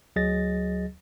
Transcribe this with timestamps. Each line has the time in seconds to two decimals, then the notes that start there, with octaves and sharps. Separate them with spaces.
0.16 D2 F#3 G#4 D#5 A6 A#6